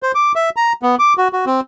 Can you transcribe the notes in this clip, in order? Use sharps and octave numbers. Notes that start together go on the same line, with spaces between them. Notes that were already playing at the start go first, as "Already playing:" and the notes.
C5
D6
E5
A#5
B3
D6
F#4
F#4
C4